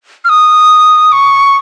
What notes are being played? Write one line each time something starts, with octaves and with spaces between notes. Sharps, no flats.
F6
D#6
C#6